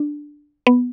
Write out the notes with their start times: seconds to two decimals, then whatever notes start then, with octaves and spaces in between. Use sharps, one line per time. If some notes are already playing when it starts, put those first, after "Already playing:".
Already playing: D4
0.67 B3